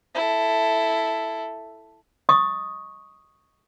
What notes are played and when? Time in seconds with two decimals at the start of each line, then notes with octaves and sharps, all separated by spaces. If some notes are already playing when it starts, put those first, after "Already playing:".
0.15 E4 A4
2.29 D#5 C#6 D#6